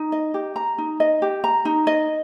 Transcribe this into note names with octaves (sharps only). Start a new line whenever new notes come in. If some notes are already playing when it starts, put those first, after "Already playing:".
Already playing: D#4
D#5
G4
A#5
D#4
D#5
G4
A#5
D#4
D#5